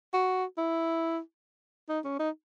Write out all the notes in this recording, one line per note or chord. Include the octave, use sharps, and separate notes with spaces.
F#4
E4
D#4
C#4
D#4